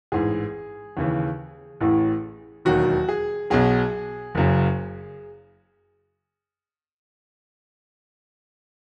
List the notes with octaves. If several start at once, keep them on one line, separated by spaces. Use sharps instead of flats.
A1 G#2 E3 G#4
D#2 C#3 E3
A1 A2 E3
E1 D#2 D#3 F#3 F#4
G#4
B1 B2 F#3 G#4
F#1 F#2 C#3